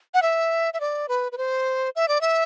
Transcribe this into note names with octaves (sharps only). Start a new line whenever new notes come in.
F#5
E5
E5
D5
B4
B4
C5
E5
D5
E5